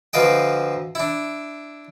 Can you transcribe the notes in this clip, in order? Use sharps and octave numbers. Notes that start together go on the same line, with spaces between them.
D2 F3 F4 B4 D#5 G5
D4 E4